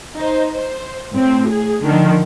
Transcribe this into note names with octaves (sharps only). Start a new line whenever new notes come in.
D#4 C5
C5
A2 C4
G#4
D3 D#3 F3